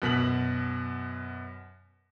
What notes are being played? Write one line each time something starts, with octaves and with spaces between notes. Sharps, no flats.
F#2 B2 B6 F#7